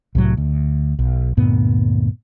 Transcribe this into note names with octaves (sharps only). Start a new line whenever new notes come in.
C2 A2 F#3
D2
B1
D2 G2 A#2 B3